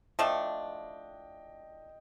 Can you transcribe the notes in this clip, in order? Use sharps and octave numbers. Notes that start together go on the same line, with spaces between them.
F3 A3 D4 D#5 G5